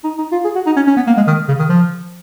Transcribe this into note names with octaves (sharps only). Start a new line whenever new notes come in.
D#4
D#4
F4
G#4
F#4
D#4
C#4
C#4
B3
A#3
G#3
D#3
C#3
D#3
F3